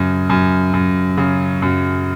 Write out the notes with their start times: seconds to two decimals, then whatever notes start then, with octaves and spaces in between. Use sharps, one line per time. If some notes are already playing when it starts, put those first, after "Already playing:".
Already playing: F#2 C#3
0.30 F#2
0.74 F#2
1.18 C#3
1.62 F#2